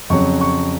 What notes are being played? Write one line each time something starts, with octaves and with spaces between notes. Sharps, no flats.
F2 C#3 F#3 C#6
C#6